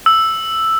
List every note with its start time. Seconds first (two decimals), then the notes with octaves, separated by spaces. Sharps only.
0.06 E6